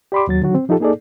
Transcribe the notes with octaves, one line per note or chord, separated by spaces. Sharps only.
G4 D5 B5 C6 D6
D#2 F#3 A6
D3 D#3 F#3 F#4
C4
F3 D#4 F4 G4 A4
A#3 D#4 G#4 A4 D5